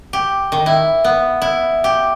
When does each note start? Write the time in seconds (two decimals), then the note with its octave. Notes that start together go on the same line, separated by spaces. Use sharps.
0.13 G4
0.52 D#3
0.66 E4
1.04 B3
1.42 E4
1.84 G4